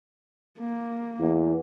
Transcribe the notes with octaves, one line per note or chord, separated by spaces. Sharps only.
A#3
E2